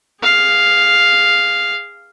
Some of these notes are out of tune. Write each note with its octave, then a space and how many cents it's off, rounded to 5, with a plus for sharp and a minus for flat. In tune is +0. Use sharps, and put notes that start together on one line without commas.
G#4 -25 F5 +0